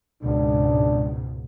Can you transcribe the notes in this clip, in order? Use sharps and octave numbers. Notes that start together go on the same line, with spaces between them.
C#2 G#2 B2 D4